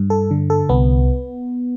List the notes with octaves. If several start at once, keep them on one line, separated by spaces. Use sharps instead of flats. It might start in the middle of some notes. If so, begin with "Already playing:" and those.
Already playing: G2
A4
D3
A4
C2 B3